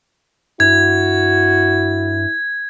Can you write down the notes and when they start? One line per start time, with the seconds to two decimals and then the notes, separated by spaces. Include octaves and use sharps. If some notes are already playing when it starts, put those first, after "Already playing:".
0.60 G2 E4 F#4 G#6